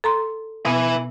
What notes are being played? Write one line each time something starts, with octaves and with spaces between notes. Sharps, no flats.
A4 A#5 C6
B2 B3 E4 G#5